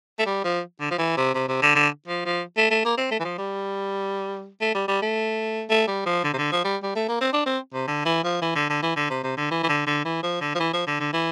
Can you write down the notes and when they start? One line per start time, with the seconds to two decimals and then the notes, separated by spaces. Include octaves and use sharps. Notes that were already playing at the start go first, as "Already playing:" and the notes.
0.19 A3
0.26 G3
0.44 F3
0.80 D3
0.91 F3
0.98 E3
1.17 C3
1.34 C3
1.49 C3
1.62 D3
1.75 D3
2.08 F3
2.25 F3
2.57 A3
2.71 A3
2.85 A#3
2.97 C4
3.11 A3
3.20 E3
3.24 F3
3.38 G3
4.61 A3
4.75 G3
4.88 G3
5.02 A3
5.69 A3
5.87 G3
6.06 F3
6.24 D3
6.33 C3
6.38 D3
6.52 F3
6.64 G3
6.83 G3
6.95 A3
7.09 A#3
7.21 C4
7.33 D4
7.46 C4
7.74 C3
7.87 D3
8.05 E3
8.24 F3
8.42 E3
8.55 D3
8.70 D3
8.82 E3
8.96 D3
9.10 C3
9.23 C3
9.37 D3
9.51 E3
9.63 E3
9.69 D3
9.87 D3
10.05 E3
10.23 F3
10.41 D3
10.55 F3
10.59 E3
10.73 F3
10.87 D3
11.00 D3
11.13 E3